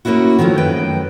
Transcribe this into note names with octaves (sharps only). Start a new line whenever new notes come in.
A#3 C4 C#4 E4 F#4
D#3 F3 F#3 A3 C#4
F#2 B4 D#5 G5